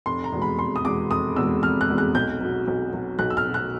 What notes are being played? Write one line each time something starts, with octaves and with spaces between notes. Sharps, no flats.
F1 C6
A#5
E2 B2 G#3
B5
F1 C6
D#6
E2 B2 G#3 D6
F1 D#6
E2 B2 G#3 E6
F1 F6
F#6
E2 B2 G#3
F#6
B1 G6
B2 F#3
B1
B2 F#3
B1 F#6
E6
F6
B2 F#3
F#6